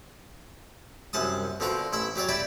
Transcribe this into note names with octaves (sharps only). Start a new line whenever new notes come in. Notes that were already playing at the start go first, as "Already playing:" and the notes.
C2 F#2 F#5 A5 D#6
B2 D3 C4 F4 F#4 A#4
A1 E4 E5
F#3 G4 C#5 D5
G3 E4 D5 E5